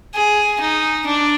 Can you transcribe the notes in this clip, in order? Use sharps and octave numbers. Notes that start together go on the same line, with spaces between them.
G#4
D#4
D4